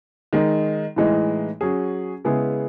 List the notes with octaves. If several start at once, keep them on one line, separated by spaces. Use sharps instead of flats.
D#3 G#3 D#4
A2 E3 G#3 D#4
F#3 C#4 G#4
C#3 G#3 B3 E4 G#4